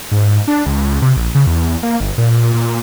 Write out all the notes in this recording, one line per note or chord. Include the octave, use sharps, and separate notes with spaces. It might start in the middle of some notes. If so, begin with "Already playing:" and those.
G#2
D4
C#2
C3
A#1
C#3
E2
A#3
G1
A#2
A#2